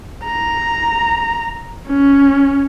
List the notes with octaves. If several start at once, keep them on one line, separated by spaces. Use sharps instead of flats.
A#5
C#4